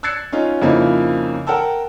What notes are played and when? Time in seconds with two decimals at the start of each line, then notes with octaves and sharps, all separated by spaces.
0.03 E6 F#6 G#6 A6 C7 C#7
0.32 C#4 D#4 F4
0.62 F2 C#3 F3 A#3 D#4 E4
1.47 A#4 F#5 G5 A5 E6